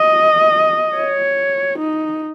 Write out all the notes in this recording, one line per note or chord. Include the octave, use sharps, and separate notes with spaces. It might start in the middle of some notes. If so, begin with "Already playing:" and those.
Already playing: D#5
C#5
D#4